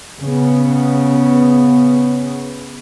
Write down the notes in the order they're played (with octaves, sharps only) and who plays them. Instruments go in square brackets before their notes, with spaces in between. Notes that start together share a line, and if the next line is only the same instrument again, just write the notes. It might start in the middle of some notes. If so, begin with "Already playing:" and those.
[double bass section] C#3 B3